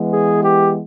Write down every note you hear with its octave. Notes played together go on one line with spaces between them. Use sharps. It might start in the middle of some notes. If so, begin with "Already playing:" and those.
Already playing: E3 G#3 B3
G#4
G4